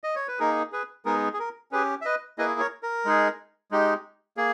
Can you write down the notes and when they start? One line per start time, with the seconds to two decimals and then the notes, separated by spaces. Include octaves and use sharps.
0.04 D#5
0.16 C#5
0.28 B4
0.39 A#3 D#4 G#4 A#4
0.72 G#4 B4
1.05 G#3 B3 D#4 G#4 A#4
1.34 G#4
1.39 A#4
1.71 C#4 G4 G#4 B4
2.01 E5
2.05 B4 D#5
2.38 A#3 E4 G#4 B4 D#5
2.60 A#4 C#5
2.83 A#4
3.05 G#3 D#4 G#4
3.71 G#3 D#4 G4
4.37 A#3 G#4